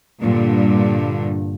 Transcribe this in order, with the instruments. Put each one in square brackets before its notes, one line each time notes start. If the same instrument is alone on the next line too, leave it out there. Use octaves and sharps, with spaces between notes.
[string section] G2 A#2 D3